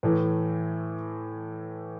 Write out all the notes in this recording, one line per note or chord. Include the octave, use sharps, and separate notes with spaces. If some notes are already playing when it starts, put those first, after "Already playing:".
A2 E3 A3